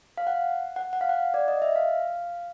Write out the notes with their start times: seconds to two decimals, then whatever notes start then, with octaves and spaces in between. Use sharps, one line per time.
0.17 F5
0.27 F#5
0.76 F#5
0.93 F#5
1.01 F5
1.09 F#5
1.34 D5
1.48 D#5
1.62 E5
1.76 F5